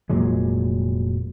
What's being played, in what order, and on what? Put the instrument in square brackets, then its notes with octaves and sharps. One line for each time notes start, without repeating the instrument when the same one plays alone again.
[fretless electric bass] F1 A#2 F#3 G#3